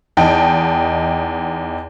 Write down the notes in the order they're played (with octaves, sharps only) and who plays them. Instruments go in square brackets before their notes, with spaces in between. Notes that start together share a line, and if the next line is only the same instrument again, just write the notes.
[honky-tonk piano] E2 D#4 G5 A5